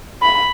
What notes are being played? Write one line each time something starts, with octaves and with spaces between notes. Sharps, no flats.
B5